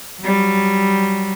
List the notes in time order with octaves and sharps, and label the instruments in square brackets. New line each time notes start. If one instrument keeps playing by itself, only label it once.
[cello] F#3 G3